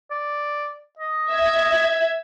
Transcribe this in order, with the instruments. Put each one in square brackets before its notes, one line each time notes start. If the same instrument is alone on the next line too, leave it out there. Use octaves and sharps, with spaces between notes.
[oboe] D5
D#5
[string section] E5 G#6